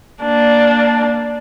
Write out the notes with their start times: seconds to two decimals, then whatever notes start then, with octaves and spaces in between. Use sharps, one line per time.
0.23 A#3 D4